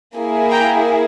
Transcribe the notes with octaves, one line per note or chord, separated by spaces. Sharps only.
A#3 E4 G#4
G5 A#5